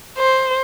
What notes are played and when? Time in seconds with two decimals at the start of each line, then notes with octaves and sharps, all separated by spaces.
0.18 C5